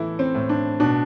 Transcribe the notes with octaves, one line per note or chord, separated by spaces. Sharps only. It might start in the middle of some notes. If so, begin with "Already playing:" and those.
Already playing: A2 E3 E4 A4
C4
A2
D4
B2 D4